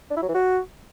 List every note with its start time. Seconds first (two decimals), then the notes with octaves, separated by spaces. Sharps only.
0.11 D4
0.17 E4
0.23 F#3
0.29 E3
0.35 F#4